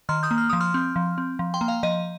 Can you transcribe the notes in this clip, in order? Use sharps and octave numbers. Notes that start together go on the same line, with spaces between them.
D#3 C6 F6
D#6 G6
A#3
F6
F3 D#6
C6 F6
C4
F3
C4
F3
G5 C6
A#3
F5 A#5
F3 D#5